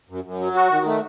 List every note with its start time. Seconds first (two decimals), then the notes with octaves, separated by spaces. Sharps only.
0.09 F#2
0.24 F#2
0.40 F#3
0.55 F#4
0.71 D#3
0.86 A3